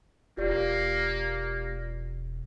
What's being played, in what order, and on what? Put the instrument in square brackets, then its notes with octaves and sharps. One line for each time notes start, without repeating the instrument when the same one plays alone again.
[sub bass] E1 [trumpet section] A#3 [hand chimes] F4 G4 D5